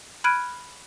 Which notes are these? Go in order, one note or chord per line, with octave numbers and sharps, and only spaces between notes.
B5 F6 F#6 G#6 D7 D#7